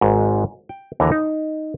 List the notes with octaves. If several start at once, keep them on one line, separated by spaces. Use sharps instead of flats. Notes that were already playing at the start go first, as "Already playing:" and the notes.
G#1 G#2
G5
D#2 D3 E3 A#5
D#4